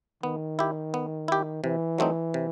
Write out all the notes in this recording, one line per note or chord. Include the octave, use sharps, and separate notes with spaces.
D#3 B3
E4 G4
B3
E4 G4
C3 E3
F#3 A3 C4 D#4
C3